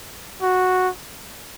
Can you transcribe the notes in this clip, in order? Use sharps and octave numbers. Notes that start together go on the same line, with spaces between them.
F#4